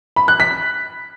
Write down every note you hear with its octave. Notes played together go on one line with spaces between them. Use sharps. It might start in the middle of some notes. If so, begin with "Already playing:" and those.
B5
F#6
B6